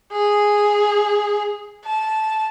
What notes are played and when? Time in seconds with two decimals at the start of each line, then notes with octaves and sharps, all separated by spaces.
0.13 G#4
1.85 A5